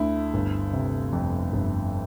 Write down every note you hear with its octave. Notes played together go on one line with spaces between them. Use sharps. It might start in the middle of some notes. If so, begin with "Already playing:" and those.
Already playing: D2 D3 E4
G1
C3
F2
G1